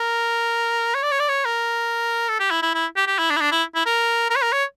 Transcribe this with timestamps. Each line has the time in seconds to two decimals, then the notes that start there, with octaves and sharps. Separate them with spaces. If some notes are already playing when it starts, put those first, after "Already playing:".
Already playing: A#4
0.94 C#5
1.03 D5
1.11 C#5
1.20 D5
1.28 C#5
1.45 A#4
2.29 A4
2.40 G4
2.51 E4
2.63 E4
2.74 E4
2.96 G4
3.07 G4
3.19 E4
3.30 D4
3.36 E4
3.41 D4
3.51 E4
3.75 E4
3.86 A#4
4.30 A#4
4.36 C#5
4.42 A#4
4.52 C#5